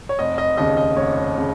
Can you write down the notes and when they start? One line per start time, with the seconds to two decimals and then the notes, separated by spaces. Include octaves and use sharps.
0.09 C#5
0.19 F1 D#5
0.38 D#5
0.57 D#2 C#3 D#5
0.77 D#5
0.96 F1 C#5
1.38 C#3